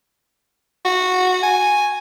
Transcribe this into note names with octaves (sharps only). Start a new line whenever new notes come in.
F#4
G#5